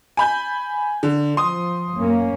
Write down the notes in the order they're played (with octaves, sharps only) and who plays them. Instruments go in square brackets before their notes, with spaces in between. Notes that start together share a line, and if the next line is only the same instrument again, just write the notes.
[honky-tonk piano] G#5 B5 G6
D3
[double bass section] F3 [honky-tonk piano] C6 D#6
[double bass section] F#2 A#3 C#4